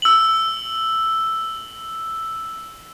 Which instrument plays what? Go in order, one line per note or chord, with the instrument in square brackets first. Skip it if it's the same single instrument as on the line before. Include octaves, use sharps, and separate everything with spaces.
[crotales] E6 F#7